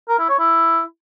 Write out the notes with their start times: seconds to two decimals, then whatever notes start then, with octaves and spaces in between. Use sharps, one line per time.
0.09 A#4
0.19 E4
0.29 C#5
0.39 E4